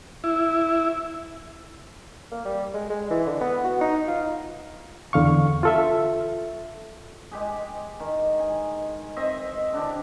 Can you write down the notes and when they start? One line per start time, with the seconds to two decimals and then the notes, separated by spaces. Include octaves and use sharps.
0.24 E4
2.32 A#3
2.45 G3
2.74 G#3
2.90 G#3
3.11 E3
3.26 D3
3.41 B3
3.64 F#4
3.81 D#4
4.07 F4
5.13 E2 D3 F5 C#6
5.63 F4 A4 E5
7.31 G#3 G4 G#4
8.00 D#3
8.39 G#5
9.16 C4 D#5 E5
9.73 D3 D4 G4